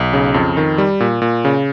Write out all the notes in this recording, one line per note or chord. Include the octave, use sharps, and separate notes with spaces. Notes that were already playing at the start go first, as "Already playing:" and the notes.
Already playing: B1
C#3
F2
D#3
G3
A#2
A#2
C#3